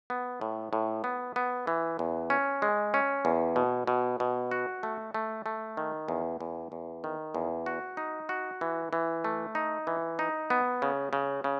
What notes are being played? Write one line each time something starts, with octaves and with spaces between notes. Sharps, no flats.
B3
A2
A2
B3
B3
E3
E2
C#4
G#3
C#4
E2
B2
B2
B2
F#4
A3
A3
A3
D#3
E2
E2
E2
D#3
E2
F#4
D#4
F#4
E3
E3
A3
D#4
E3
D#4
B3
C#3
C#3
C#3